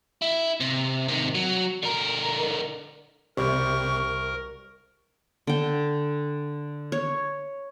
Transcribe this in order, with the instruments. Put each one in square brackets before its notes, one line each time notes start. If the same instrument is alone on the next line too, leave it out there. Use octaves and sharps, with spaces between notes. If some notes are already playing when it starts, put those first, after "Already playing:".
[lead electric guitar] E4
C3
C3 D#3
F#3
D3 A#4
[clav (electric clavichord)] C2 G3 [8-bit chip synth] C3 [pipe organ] A#4 [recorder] C#6
[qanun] D3 G5
C#5